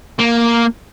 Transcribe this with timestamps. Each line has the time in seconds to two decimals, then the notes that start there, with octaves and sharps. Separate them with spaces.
0.19 A#3